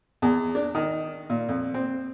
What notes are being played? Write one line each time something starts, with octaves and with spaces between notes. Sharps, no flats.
E2
D4
D#3
A#2
F2
C4